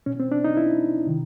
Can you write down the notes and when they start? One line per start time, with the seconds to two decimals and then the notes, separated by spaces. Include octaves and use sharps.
0.06 B2 C#4
0.20 C4
0.32 D4
0.44 D#4
0.57 E4
1.07 C3 D#3